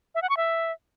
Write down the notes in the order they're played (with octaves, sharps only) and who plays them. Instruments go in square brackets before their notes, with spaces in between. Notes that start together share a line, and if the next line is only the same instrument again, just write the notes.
[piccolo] E5
F#5
C#6
E5